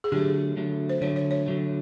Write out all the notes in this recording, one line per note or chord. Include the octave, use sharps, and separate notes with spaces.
G#4
D3 F#3 A3 G4
D3 F#3 A3
C5
D3 F#3 A3 C#5
C#5
C#5
D3 F#3 A3